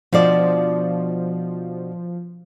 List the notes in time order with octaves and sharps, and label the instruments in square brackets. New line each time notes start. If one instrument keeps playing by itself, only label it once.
[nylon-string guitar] B2 D4 D5 [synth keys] F3